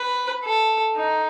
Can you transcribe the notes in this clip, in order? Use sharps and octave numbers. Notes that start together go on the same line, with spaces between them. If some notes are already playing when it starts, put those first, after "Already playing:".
Already playing: B4
A4
D#4